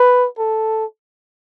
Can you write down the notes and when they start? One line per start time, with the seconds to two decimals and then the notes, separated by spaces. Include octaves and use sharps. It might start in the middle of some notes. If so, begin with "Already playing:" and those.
Already playing: B4
0.38 A4